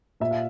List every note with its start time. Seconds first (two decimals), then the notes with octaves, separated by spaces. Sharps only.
0.20 A#2 E5
0.31 F5